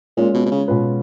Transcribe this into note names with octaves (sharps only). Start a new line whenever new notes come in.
A#2 G#3 C#4 F4
B2
B2
C#3
B2 G#3 C#4 F4 B4